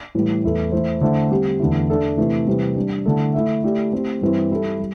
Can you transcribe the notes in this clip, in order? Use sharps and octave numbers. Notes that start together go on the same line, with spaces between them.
A2 E3 G3
E2 E3 A3 E4 A4
E3 A3 E4 C5
D3 A3 E4 C5 E5
G3 C4 G4
E2 D3 A3 E4
A3 D4 A4 E5
C3 E3 A3 E4
C3 E3 G3
G3 D4 G4
D3 A3 E4 A4
A3 E4 A4 E5
A3 E4 G4 D5
A3 C4 E4 G4
G2 E3 C4 E4
G3 E4 A4
G3